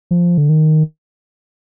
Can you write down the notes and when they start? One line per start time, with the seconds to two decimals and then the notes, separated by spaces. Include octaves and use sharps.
0.11 F3
0.38 D3
0.49 D#3